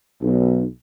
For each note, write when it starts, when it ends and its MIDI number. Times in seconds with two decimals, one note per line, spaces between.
0.23 0.64 35